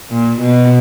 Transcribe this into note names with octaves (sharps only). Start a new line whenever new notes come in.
A#2
B2